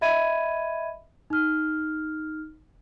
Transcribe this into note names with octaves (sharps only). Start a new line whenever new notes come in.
D#5 E5 B5 G#6 D#7
D#4 F6